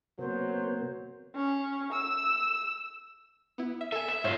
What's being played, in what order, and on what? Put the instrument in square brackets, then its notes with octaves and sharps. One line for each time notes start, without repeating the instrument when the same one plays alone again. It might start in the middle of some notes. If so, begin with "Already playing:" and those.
[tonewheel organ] C3 A#3 B3 [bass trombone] F#3 [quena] C5
[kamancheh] C#4
E6
[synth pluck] B3 E4
E5
[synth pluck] A4 G#5 [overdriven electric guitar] E5
[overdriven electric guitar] E5
[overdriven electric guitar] G#2 F4 [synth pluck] C5 C#5 F6